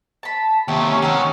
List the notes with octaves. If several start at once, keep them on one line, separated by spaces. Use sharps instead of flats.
A5 B5
D#2 C3 G4 C#5 E5
C#4
D#3 C4 C#5 F#5